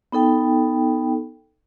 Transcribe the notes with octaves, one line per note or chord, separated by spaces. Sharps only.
B3 D#4 A4 G5